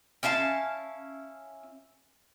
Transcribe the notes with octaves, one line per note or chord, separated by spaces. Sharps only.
C#4 E4 F5 A5